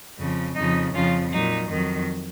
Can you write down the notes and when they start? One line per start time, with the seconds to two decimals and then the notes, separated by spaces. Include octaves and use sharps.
0.19 F2 C#3 F3
0.56 F2 C#3 F3 D#4
0.94 F2 C#3 F3 C#4 F4
1.31 A#2 F#3 D#4
1.70 F2 D#3 F#3